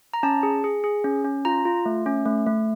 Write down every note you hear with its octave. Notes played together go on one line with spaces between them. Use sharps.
A#5
C#4 A5
G#4
G#4
G#4
C#4
C#4
F4 A#5
F4
A3
C#4
A3
A3